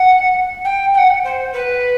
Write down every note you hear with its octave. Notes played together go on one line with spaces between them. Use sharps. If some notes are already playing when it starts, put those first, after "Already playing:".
Already playing: F#5
G5
G5
F#5
C5
B4